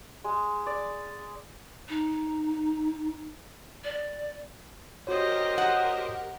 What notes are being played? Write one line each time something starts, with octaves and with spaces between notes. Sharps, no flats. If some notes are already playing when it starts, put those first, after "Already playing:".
G#3
D5
D#4
D5
F#4 G4 A#4 C5 C#5 D#5
F#5